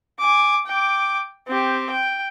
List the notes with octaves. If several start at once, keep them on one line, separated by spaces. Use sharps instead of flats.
G#5 D6
G5 D6
C4 G4
G5